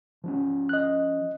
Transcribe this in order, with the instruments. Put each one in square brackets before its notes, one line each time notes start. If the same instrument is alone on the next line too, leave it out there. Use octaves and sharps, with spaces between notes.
[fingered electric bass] F3 C4 C#4
[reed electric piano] D#5 F#6